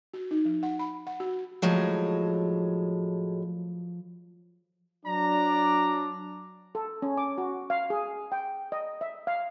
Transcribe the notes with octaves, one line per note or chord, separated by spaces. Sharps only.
F#4
D#4
F3
F#5
B5
F#5
F#4
A2 F3 F#3 G#3
F#3 D4 D5 A#5
A4
C#4
D6
F#4
F5
G#4
G5
D#5
E5
F5